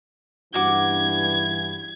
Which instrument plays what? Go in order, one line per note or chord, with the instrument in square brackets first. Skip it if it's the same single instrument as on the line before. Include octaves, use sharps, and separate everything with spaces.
[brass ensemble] G2 E3 [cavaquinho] F#4 D6 [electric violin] G#6